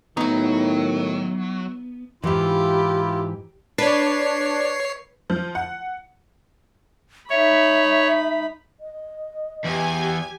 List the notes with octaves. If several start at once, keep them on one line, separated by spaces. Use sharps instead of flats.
A2 D#3 F#3 B3 D#4 E4
G#2 E3 E4 F4 G4
D4 B4 C#5 C7
F3
F#5
D#4 C#5 E5 B5
D#5
E2 G4 G#5 G#6